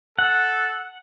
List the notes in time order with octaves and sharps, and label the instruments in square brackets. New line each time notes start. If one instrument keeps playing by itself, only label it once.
[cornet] A4 [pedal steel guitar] F#5